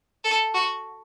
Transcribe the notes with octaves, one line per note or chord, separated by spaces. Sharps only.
A4
F#4